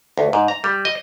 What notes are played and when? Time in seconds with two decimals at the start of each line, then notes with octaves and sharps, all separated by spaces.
0.18 D2
0.33 G#2
0.48 A#5
0.64 G3
0.85 D#5